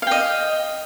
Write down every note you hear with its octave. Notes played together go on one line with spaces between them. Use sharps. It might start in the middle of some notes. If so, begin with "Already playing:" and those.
D#5 F5 G5